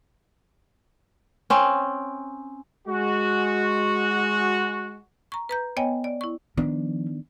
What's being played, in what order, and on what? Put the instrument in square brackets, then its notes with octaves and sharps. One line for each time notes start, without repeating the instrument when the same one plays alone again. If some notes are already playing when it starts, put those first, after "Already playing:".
[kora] C4 C#4
[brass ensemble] G#3 F#4
[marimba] A#5 C#6
B4 A#5 G6
B3 C#5 D#5 G5 G#5
D5
E4 C#6
[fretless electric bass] D#3 B3 D4 [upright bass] F3